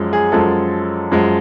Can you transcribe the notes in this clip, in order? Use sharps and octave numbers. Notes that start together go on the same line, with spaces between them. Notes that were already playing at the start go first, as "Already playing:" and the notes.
Already playing: F#2 F3 G#3
G#4
F#2 F3 G#3 A4
F#2 F3 G#3